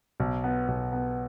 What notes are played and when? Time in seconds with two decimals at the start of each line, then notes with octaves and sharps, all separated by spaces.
0.20 B1
0.44 B3
0.68 B1
0.92 B3